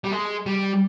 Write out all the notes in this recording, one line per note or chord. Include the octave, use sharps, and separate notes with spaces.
G3
G#3
G3